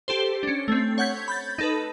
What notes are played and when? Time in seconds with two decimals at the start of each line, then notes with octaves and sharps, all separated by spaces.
0.08 G4 A4 C5
0.43 C#4 D4
0.68 A3 C4
0.98 C#5 F#5 G6 G#6 B6
1.28 B5 G6 A6
1.58 D#4 A4 B4